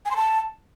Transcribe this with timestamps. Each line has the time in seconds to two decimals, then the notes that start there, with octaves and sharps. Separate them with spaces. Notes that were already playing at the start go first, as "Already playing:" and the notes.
0.05 G#5
0.11 C6
0.16 A5